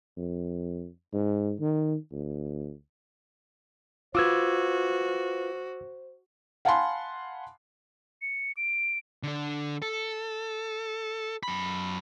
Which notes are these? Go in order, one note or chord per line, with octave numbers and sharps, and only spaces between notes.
F2
G#2
D#3
D2
F4 F#4 B4 C5 D6 E6 G#6
F5 F#5 G#5 A5 B5 C6
C#7
D7
D3 D4
A4
F#2 B5